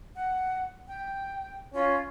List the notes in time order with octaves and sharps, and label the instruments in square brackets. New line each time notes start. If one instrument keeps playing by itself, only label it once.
[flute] F#5
G5
[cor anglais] C#4 [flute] F4